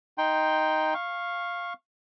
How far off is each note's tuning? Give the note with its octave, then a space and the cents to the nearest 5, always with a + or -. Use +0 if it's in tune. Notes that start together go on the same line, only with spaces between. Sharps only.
D#4 +5 G5 +0 C6 +0
F5 +0 C#6 -20